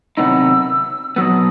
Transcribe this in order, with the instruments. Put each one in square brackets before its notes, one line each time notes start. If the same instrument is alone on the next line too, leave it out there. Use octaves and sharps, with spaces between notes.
[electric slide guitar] C3 D#3 F#3 B3 D#4 [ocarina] E6
[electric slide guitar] B2 F#3 B3 [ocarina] D#6 E6